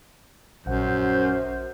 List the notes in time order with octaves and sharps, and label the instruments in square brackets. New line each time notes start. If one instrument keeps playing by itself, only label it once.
[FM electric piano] A#1 F#5 [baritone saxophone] F#2 [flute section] C5 G6